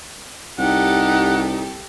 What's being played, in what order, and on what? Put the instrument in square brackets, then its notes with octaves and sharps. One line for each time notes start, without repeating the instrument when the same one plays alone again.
[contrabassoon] C2 [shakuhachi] D#4 [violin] G4 A4 [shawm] F#5